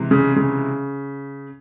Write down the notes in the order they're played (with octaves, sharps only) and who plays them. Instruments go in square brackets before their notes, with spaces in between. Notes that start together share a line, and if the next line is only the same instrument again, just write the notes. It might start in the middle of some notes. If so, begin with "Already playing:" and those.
Already playing: [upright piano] C3 E3 G#3
[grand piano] C#3
C#3